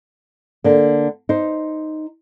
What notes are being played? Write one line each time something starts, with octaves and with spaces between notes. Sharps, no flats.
D3 A#3
D#4 C5